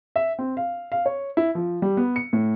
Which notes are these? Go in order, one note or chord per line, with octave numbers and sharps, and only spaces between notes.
E5
C4
F5
F5
C#5
E4
F3
G3
B3
C#7
A2